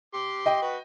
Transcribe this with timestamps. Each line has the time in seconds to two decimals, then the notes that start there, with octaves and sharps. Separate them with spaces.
0.14 G4 C6
0.46 D#5 G5
0.62 F#4 B4